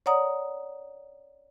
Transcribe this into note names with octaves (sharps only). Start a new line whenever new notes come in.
C#5 D5 F#5 A#5 D#6